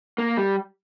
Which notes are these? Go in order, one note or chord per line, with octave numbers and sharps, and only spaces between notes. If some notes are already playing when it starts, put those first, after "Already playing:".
A#3
G3